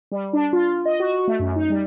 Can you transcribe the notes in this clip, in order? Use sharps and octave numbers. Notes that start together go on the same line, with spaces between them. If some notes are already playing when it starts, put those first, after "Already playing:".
G3
D4
F4
D#5
F#4
A3
F#2
D#4
G3